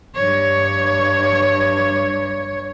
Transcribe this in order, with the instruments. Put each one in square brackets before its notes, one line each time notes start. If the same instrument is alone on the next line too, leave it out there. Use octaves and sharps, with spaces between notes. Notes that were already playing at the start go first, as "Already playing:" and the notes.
[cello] G2 C#5